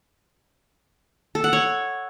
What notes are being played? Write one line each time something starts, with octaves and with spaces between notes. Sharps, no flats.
A4
F#5
C#5